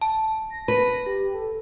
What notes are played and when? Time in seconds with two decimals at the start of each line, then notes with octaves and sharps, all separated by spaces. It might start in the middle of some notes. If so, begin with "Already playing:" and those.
0.02 A5
0.50 A#6
0.68 B4
1.06 G4
1.33 A4